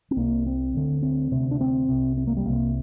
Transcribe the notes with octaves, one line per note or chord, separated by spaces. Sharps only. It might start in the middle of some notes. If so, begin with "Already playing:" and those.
C4
C2 C3 A#3
C4
D2 D3
C4
D2 C3
D4
C4
C2 C3
C4
A#3
G3
C2 C3 A#3